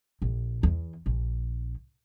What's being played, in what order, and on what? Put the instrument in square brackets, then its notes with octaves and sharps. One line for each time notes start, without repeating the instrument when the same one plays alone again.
[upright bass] A#1
E2
A#1